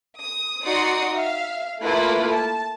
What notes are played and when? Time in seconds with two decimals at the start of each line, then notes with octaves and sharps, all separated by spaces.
0.18 D#6
0.65 D#4 F#4 D5 C6 D#6 C#7
1.12 E5 F5
1.82 A3 A#3 E4 F4 A4 B4
2.31 A5